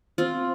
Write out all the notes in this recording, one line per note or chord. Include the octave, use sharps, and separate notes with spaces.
C4 F4